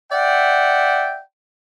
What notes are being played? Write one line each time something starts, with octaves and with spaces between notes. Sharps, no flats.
D5 E5 F#5 G5